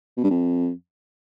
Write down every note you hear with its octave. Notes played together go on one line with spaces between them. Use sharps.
B2
G2
F2